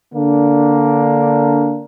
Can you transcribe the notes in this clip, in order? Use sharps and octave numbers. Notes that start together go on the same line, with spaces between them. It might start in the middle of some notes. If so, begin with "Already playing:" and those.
D3 A#3 D4